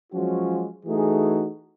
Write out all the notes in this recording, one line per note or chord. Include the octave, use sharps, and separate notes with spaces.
F3 F#3 G#3 C#4 F4 F#4
E3 A3 D#4 F#4 G#4